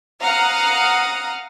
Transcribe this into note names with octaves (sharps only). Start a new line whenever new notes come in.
F5 F#5 A#5 D#6